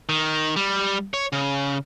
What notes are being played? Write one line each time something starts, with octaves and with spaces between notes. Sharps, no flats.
D#3
G3
C#5
C#3